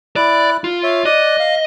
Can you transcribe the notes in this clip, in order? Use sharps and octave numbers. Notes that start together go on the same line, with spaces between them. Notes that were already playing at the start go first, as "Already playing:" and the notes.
E4 D5 F#6
F4
C#5 E5
D5 D#5 F#6
F5